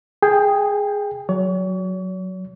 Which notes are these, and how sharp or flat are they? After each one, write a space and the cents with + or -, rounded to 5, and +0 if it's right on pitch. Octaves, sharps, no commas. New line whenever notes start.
G#4 +0 G5 +20
F#3 +0 C#5 +40